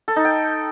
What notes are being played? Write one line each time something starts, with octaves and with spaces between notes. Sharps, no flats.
A4
D#4
G5